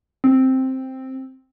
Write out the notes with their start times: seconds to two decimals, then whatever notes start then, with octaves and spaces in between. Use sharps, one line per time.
0.24 C4